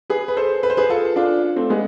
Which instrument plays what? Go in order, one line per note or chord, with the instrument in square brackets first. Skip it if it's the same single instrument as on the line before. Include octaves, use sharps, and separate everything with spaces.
[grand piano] G#4 B4
B4
A4 C5
B4
C5
G#4 B4
F4 A4
D4 F4
A3 C4
G#3 B3